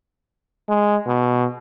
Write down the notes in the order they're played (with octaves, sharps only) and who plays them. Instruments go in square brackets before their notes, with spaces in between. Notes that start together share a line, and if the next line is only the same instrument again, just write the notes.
[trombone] G#3
B2